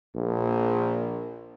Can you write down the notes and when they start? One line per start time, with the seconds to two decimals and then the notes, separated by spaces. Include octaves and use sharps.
0.16 A#1